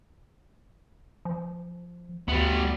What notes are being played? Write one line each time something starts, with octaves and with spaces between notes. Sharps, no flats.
F3
D2 G3 B3